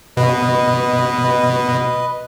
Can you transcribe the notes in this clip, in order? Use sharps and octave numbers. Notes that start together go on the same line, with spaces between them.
B2 B4 D#5